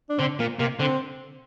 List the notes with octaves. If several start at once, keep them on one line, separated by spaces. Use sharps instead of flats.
D4
D3 C4
A#2 A#3
C3 A#3
D3 C4